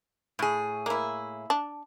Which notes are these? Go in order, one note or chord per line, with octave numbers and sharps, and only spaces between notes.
A2 G#4
A#3 E4
D4